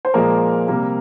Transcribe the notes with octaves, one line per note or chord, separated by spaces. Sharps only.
C5
A#2 F3 G#3 A#3 A#4
C3 G3 A#3